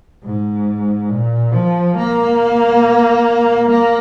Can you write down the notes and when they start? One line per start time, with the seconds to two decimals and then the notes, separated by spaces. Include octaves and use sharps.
0.24 G#2
1.10 A#2
1.53 F3
1.97 A#3
3.70 A#3